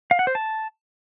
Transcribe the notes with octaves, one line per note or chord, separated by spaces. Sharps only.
F5
F#5
C5
A5